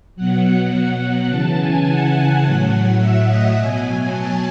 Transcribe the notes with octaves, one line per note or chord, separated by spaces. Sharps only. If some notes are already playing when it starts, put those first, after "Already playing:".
B2 F#3 F#5
C#3 E3 A5
G#5
F#5
A2 F#3
E5
D#5
B2 F#3 G#5
G#5
A5